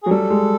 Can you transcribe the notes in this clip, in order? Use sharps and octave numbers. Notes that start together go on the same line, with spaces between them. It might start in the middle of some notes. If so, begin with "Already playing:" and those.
G#4
F#3
G3 A4
G#3